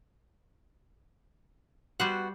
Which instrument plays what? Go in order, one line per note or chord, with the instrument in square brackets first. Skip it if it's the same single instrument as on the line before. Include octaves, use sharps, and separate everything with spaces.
[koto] G3 C5 F#5 [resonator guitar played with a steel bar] B3 F#4